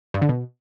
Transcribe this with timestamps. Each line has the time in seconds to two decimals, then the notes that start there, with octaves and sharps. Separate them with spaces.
0.14 G2
0.22 D3
0.29 B2